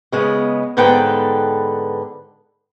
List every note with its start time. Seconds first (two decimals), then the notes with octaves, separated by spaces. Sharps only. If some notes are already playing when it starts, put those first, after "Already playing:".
0.12 C#3 G#3 B3
0.77 G#2 D3 B3 A4 B4 G5